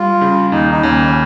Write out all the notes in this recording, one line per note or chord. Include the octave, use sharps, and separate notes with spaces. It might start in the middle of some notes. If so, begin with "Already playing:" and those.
Already playing: G3 F4
C#3
D#2 D#4
D#4
D#2 C#4